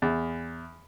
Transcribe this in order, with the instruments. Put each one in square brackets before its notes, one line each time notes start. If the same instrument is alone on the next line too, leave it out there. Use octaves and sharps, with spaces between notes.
[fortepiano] E2